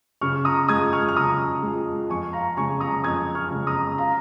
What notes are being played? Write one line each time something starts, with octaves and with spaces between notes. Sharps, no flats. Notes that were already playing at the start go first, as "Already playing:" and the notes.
C#3 C#6 F6
A#5 D#6
G#3 F4 D#6 G#6
C#6 F6
F6
C#3 A#5 D#6
G#3 F4
F2 G#5 C#6
F5 A#5
C#3 G#3 G#5 C#6
A#5 D#6
F2 D#6 G#6
C#6 F6
C#3 G#3
A#5 D#6
F5 A#5